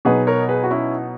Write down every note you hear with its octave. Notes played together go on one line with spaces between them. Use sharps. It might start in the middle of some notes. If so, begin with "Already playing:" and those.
B2 F#3 B3 D#4 G#4 B4
A#4 C#5
G#4 B4
F#4
C#4 E4